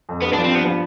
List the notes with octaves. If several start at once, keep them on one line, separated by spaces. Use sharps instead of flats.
F2
G2 B3
D4
F3
C4
G2 B3
F3